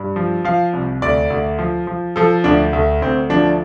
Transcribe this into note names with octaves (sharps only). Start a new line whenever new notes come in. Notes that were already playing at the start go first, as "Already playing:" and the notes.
Already playing: G2
F3
F3 F5
C2
D2 D5
D2
F3
F3
F3 A4
D2 D4
D2 A3
D2 C4
F3 D4